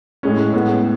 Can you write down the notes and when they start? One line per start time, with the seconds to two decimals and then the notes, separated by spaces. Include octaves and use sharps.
0.23 A2 G#3 C#4
0.53 A2 G#3 B3